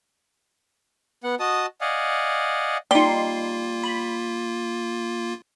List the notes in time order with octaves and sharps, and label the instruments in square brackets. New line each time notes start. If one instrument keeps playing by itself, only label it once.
[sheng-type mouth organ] B3 F#5
F#4 D#5 A5 D#6
D5 D#5 F5 F#5 G#5
[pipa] G3 [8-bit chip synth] A#3 F4 [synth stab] D#4 C6
[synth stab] B5